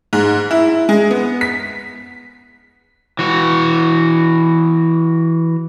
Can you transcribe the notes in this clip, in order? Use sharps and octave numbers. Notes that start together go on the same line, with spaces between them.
G#2
E4
G#3
B3
B6
E3 F#4